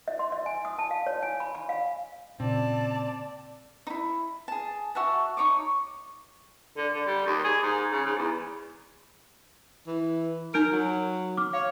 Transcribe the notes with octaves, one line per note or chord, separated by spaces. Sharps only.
E5
C6
E5
G#5
D#6
A5
F5
C#5
G#5
B5
B5
F5
A#2 C#3 C4 D5 A5
D#4 E4
G#4 A5
F#4 E5 F#5 A5
D#4 C#5 C#6 D6
D3
D3
G3
D#2
G#4
G#2
C#3
G#2
E2
E3
D#4 A#4 G6 D7
F#3
D6 F6
C#5 F5